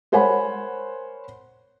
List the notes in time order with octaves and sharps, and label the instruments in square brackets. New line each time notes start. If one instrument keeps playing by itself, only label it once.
[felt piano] A#4 C5 C#5 F#5 G#5 B5